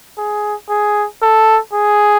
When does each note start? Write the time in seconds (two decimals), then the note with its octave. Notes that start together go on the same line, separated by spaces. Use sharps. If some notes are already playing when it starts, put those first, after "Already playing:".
0.18 G#4
0.70 G#4
1.22 A4
1.73 G#4